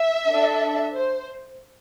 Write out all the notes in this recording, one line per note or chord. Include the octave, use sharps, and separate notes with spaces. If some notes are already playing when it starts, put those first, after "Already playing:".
Already playing: E5
D4 A4
C5